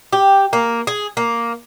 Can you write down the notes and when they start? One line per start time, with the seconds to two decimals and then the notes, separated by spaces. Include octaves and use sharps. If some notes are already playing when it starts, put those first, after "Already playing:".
0.12 G4
0.53 A#3
0.87 G#4
1.17 A#3